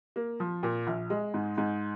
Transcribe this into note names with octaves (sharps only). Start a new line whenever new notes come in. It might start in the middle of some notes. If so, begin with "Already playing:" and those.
A#3
F3
A#2
A#1
G#3
G#2
G#2